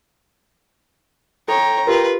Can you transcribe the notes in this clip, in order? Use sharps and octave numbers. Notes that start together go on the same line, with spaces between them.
A4 C#5 G5 A#5
F4 G4 A#4 B4